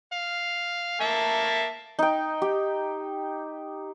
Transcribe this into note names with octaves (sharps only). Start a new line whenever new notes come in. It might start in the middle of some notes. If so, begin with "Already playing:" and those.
F5
A#3 E5 A5
D#4 G5
G4